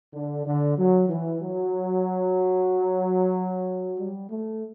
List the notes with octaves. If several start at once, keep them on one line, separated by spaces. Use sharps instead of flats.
D3
D3
F#3
E3
F#3
G3
A3